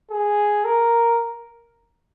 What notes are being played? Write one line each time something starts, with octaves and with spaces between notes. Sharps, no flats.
G#4
A#4